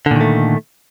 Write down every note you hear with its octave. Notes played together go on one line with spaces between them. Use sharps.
A#2 D3 D#3 A3